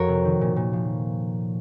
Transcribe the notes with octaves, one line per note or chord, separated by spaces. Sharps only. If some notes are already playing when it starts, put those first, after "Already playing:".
Already playing: F2 F#4 A#4 C#5
C3
D#3
A#2
A#2
F3